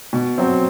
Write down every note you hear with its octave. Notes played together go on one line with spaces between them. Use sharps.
B2
F#3 C4